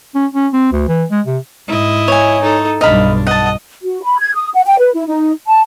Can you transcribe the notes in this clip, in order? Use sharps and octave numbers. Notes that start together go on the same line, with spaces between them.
C#4
C#4
C4
D2
E3
G#3
C3
G#2 E4 D#5
C#5 G#5
D#4 A4
B1 G2 D4 D#5 F5 B5
D#5 F#5 A5
F#4
B5
G#6
D#6
F#5
G5
B4
E4
D#4
A5